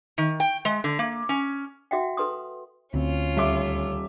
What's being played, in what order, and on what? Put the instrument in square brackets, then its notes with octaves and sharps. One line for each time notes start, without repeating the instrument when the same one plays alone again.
[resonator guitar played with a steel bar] D#3
G5
G#3
D3
A#3
C#4
[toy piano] F#4 E5 F#5 G5
A4 B4 C6 D#6
[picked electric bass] D2 C4 [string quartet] C#4 F4
[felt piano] D#1 E5 D6